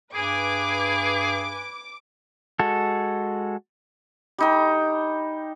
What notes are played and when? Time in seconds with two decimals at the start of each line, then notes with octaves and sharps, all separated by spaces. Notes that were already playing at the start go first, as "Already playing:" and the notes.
0.15 G2 G#4 B4 G#5 D6
2.59 G#3 F#4 A4
4.38 G3 D#4 G5